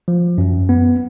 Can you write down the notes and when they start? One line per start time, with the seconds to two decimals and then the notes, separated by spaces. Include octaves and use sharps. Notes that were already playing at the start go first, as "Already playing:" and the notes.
0.08 F3
0.38 F#2
0.69 B3